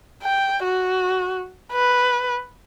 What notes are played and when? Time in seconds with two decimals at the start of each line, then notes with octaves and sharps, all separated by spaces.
0.23 G5
0.64 F#4
1.72 B4